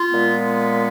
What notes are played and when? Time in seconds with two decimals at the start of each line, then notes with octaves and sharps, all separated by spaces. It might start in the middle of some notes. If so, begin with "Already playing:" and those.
Already playing: F4
0.09 A#2 G#3 B3